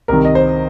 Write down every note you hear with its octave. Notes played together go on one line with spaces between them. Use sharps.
C2 C3 D#3 A#4
D#5
C5